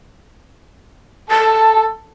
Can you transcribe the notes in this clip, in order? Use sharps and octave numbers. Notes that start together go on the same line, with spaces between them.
A4 A5